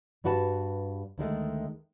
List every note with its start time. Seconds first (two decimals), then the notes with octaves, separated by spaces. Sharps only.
0.24 G2 G3 F#4 B4 G5 A5
1.18 D2 D#3 G#3 A3